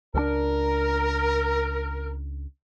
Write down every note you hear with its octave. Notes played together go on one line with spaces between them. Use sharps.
C#2 G3 D4 A#4